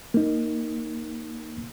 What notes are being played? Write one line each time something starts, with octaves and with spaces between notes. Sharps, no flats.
A#3 D#4